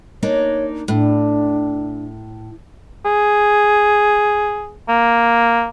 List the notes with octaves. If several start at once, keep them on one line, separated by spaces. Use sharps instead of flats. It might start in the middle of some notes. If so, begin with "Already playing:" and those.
A#3 D4 D#4 C#5
A2 D4
G#4
A#3